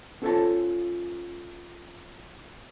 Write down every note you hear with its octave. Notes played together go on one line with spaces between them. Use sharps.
C#4 F4 A4 C5 C#5 A5